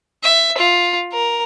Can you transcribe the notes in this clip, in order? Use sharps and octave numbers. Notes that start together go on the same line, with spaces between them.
E5
F4
A#4